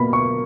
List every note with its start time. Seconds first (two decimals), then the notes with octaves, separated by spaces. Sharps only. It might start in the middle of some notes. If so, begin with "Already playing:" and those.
Already playing: B2 A#3 B5
0.13 C#6